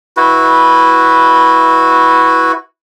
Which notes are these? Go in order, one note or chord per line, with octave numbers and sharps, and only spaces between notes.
E4 F#4 B4